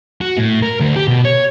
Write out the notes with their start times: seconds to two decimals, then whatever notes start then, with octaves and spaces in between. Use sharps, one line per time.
0.21 F#4
0.37 A2
0.62 A#4
0.80 D2
0.96 G4
1.08 B2
1.25 C#5